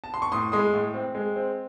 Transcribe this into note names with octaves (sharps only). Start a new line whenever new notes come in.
A5
C6
C#6
A2 C6 D#6
G#3 C6 D#6
A2
C4
G#3
C4